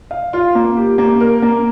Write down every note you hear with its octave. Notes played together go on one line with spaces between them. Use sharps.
F5
F4
A#3
G4
A#3
A#4
A#3